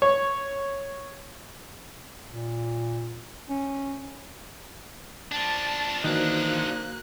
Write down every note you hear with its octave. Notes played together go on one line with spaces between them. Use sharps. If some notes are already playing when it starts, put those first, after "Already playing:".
C#5
A#2
C#4
F3 D4 A5
D#3 E3 A#3 D#4 F#4 C5 F#6